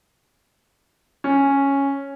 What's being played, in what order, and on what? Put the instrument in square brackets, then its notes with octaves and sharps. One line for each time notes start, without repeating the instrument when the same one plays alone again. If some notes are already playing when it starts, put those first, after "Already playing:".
[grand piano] C#4